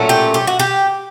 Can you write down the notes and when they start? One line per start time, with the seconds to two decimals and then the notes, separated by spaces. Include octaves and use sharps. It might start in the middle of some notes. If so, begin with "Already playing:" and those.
Already playing: A#2 F#3 A3 C#4
0.09 G4
0.34 G4
0.47 F#4
0.59 G4